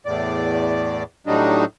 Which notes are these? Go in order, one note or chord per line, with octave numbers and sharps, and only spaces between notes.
E2 A2 D5
A2 F#3 G3 D4 D#4